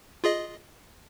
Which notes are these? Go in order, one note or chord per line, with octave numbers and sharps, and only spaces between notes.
F4 G#4 D#5